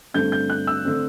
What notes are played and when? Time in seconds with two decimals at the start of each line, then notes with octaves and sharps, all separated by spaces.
0.14 G2 D3 A3 C4 G6
0.32 G6
0.50 F#6
0.67 E6
0.85 D3 A3 C4